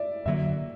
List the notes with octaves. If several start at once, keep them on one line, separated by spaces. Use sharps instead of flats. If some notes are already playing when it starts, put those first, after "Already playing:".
Already playing: D5 E5
F#2 D3 F#3 A#3 E5